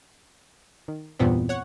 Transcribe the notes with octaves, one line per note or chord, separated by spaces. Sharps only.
D#3
E2 G2 A#2 B3 C4
C#5 F#5